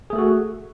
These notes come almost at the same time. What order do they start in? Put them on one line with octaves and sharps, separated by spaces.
G#4 A3 A4 F#4